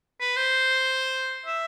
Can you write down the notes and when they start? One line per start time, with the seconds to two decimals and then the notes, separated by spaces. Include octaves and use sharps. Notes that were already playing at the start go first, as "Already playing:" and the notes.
0.20 B4
0.36 C5
1.46 E5